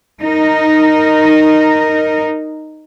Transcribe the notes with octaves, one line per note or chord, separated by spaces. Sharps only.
D#4 A#4